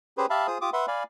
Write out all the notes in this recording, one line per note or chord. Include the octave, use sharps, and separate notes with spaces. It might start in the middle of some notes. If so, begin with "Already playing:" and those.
C#4 G4 G#4 B4 C5
G4 E5 F5 A5 B5
F4 G#4 C5 D#6
F4 G4 D6 D#6
B4 E5 F#5 C6
D5 F5 G#5 B5